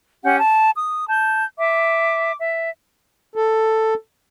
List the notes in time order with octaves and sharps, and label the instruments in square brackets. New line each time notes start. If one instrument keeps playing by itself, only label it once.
[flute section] C#4 G4 F#5 G6
A5
D#6
A5 G6
E5 D6
E5
[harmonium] A4